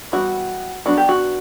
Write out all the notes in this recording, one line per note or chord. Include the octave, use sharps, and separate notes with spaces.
E3 G3 B3 F#4
F#3 B3 D4 F#4
G4
F#4